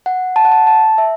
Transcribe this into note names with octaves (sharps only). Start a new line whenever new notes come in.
F#5
A5
F#5
A5
A5
E5